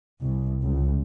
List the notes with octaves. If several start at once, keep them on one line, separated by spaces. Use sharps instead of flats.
C2
C#2